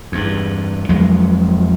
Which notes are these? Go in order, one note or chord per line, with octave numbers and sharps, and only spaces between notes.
E2 G2
F2 F#3 G#3 A3